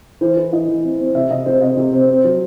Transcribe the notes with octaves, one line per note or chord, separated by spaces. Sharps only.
E3 C5
E3 B4
E3 D#5
E3
C4
C4
C3 E5
C3 D#5
C3 C5
C4 D#5
C3
C4
C4
F#3